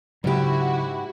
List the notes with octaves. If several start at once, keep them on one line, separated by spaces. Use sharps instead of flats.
G#2 C#3 F#3 E4 F#4 G4